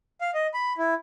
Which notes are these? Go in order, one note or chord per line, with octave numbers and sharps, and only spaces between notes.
F5
D#5
B5
E4